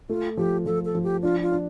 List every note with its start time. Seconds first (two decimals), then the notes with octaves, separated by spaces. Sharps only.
0.09 A3 F4
0.37 F3 G4
0.66 F3 A4
0.85 A4
0.95 F3
1.04 G4
1.23 D4 F4
1.42 F4
1.52 D4